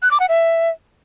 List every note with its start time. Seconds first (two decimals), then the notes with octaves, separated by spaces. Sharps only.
0.02 F#6
0.11 D6
0.20 F#5
0.29 E5